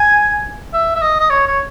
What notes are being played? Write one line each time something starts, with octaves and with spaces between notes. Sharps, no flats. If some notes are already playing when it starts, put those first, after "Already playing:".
Already playing: G#5
E5
E5
D#5
D#5
C#5
C#5